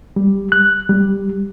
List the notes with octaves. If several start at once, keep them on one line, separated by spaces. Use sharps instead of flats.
G3
F#6
G3